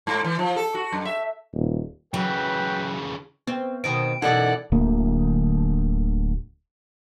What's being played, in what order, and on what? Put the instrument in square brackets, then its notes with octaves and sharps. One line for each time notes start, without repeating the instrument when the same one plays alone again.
[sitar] G#2
E3
F3
A4
F#4
F#2
E5
[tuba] D#1
[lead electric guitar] C#3 E3 [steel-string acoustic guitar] F#3 [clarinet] B4 [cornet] G5
[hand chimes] B3 [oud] C4
[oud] B2 D#3 C4 [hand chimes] D7
[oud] F#2 B2 E3 [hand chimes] D#4 A4 [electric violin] D5 F#5
[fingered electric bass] D1 D2 A#3